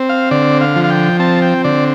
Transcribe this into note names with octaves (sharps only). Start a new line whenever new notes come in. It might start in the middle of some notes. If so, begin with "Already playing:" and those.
Already playing: C4
F5
D3 D5
F5
F3
F5
G5
C4 A5
G5
D3 D5